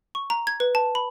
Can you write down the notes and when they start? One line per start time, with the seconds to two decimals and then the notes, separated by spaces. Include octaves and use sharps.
0.15 C#6
0.30 A#5
0.47 G#6
0.60 B4
0.75 A5
0.95 B5